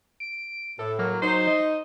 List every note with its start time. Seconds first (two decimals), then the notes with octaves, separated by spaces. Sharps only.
0.20 D7
0.79 A2 A4
0.99 F#3 A#3
1.22 F#3 D#4 C5
1.47 D#5